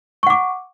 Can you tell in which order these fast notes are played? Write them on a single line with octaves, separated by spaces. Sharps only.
C#6 F#5 D6